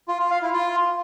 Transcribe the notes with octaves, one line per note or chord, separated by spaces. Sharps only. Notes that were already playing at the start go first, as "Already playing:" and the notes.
F4
F4
F5
E4
F4